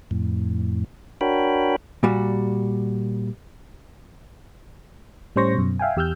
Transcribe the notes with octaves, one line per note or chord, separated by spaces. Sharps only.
F2 A2
D4 F#4 A#4 C#5 G5 B5
A#2 G3 F#4
A2 G3 C#4 C5 C#6 A#6
F#2 B2
E5 F5 G5 G#5
E2 G4 E6 F6 G6